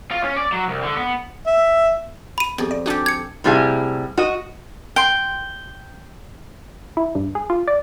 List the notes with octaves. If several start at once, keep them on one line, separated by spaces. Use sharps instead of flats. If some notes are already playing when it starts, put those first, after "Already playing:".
F4
C#4
D5
F#3
C2
D3
B3
E5
B5 D#7
F2 B3 G4 G#4
D5
D4 F#4 G4 A4 G#5
G#6 C#7
A2 C3 G3 E4 G#4 F5
F#4 D#5
G5 C6
E4
G2
G#4
F4
D5